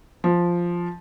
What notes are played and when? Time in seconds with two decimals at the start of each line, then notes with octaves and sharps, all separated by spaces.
0.24 F3